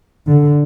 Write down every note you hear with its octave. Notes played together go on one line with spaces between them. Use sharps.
D3